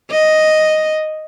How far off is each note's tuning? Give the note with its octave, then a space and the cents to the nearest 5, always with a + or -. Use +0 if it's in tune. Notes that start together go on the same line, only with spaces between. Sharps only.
D#5 +0